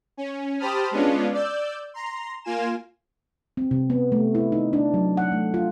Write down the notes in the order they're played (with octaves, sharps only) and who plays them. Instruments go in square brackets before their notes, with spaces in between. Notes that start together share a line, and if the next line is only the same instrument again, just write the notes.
[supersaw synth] C#4
G4 C5 A5 B5 D#6 F6
G#3 B3 C#4 D4 F4
D5 E6 G6
A#5 C6
A#3 F4 G#5 E7
[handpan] C4
C3
B3
A3
E4
D#4
D4
F#3
F#5
A3
F4